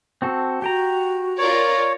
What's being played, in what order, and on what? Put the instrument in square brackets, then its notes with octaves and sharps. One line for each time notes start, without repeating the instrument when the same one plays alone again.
[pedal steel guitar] C4 F#4 A4
[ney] F#4 [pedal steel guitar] G4 G5 A#5
[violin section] F4 A#4 D5 [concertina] C#5